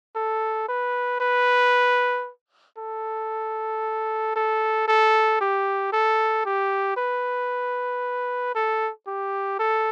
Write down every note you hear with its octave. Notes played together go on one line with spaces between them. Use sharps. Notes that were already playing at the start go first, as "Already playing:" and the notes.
A4
B4
B4
A4
A4
A4
G4
A4
G4
B4
A4
G4
A4